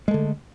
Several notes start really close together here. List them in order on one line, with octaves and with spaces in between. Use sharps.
G#3 A3 D3